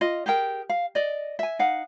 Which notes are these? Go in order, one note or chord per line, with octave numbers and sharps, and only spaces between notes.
F4 D#5
G4 G#4 A#4 G5
F5
D5 D#5
E5 G#5
D#4 F5 F#5